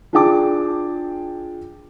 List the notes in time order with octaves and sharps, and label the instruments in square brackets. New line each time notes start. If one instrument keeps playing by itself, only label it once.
[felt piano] D4 F4 G#4 G5 A5 D6